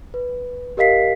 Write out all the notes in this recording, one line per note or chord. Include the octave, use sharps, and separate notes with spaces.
B4
G4 A#4 D#5 F5 B6 C7